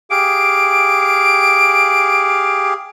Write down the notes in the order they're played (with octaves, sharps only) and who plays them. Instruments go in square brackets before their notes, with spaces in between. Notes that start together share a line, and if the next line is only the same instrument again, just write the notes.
[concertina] G4 G#4 F5 [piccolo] D7